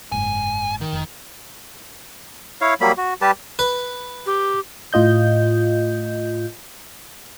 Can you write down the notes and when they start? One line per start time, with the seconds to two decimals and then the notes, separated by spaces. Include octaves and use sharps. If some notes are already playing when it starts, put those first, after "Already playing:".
0.12 F#1 G#2 G#5
0.81 D#3
0.92 F1
2.61 E4 C#5 F5
2.81 F#3 G3 A#3 B5
2.97 F#4
3.22 G3 G4 B4 A5
3.59 B4
4.26 G4
4.93 A2 F4 D#5 G6